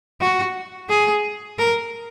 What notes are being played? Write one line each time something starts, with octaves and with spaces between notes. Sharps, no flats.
F#4
G#4
A#4